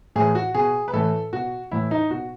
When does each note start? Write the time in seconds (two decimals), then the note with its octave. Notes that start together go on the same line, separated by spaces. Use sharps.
0.16 A2 E3 G#4
0.35 F#4
0.55 B2 G#4
0.88 B4
0.93 A2 E3 A4
1.33 B2 F#4
1.72 A2 E3 E4
1.91 D#4
2.11 B2 F#4